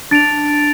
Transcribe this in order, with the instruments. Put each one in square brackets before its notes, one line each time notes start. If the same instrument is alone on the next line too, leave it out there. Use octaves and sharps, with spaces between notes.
[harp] D4 [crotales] A6 D7 F7